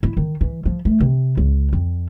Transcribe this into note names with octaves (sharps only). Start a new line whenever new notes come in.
E4
D#3
E3
F3
A3
C3
C#2
F2